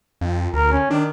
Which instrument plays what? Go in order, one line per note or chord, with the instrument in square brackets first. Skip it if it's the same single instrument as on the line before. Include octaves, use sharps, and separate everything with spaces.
[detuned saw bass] F2
[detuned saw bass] D2 [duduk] A#4
[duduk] C#4
[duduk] D#3 [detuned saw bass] D4